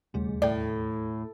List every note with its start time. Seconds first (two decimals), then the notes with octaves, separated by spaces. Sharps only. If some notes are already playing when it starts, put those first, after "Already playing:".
0.14 E1 D#2 C#3 G3 A3 G#4
0.42 A2 E4 A4 D5 E5 G5